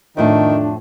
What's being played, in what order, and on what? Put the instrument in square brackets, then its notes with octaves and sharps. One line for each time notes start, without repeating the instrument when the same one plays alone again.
[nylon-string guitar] F2 A2 A5 [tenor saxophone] D#3 [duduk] D4